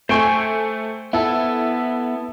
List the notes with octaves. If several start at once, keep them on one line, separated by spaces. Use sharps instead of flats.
A3 C5 G5 G#5 C#6
B3 E4 A4